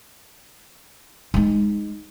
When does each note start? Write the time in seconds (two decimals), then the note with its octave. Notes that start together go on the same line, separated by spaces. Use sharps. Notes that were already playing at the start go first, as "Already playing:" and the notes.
1.34 G#3 D#4